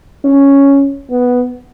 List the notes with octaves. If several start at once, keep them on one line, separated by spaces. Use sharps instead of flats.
C#4
B3